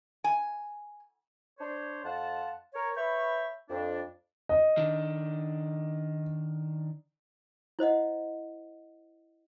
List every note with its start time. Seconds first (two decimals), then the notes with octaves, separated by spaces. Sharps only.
0.24 G#5
1.59 D4 C5 C#5
2.04 F2 C5 F5 F#5 A5
2.73 A#4 C#5
2.96 B4 C#5 E5 G5 B5 C#6
3.69 F2 D4
4.49 D#5
4.78 D#3 D4
7.79 E4 C5 D#5 F#5